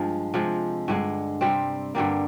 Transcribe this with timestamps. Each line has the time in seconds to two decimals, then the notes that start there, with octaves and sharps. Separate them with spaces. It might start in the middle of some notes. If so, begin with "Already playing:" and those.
Already playing: G2 F3 G#3
0.34 C3 F3 G#3
0.88 G2 D3 G#3
1.41 C3 G3 C4
1.95 G2 D3 G3 A#3